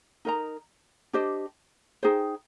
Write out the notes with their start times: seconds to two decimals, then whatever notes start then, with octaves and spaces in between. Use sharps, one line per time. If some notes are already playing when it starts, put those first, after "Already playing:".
0.25 D#4 A#4 D#5 A#5
1.13 D4 G4 C5 D#5
2.03 D#4 G#4 C5 G5